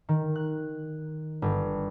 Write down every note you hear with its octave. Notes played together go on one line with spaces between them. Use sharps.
D#3
F#6
G1